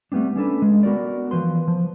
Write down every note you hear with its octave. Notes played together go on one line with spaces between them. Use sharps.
G3 A3 B3 C4 D4
C#4 D4 A4 B4
G#3
B3 F#4 A#4 D5
E3 F3 B4 C6
F3